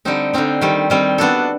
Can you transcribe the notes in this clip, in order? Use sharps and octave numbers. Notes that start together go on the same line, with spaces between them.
D3 G3 C4 D#4
D3 G3 C4 D#4
D#3 G3 C4
D#3 G3 C4
B3 D4 F#4 A4